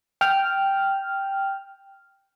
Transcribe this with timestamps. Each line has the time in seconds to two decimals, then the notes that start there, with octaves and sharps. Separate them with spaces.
0.21 G5 F6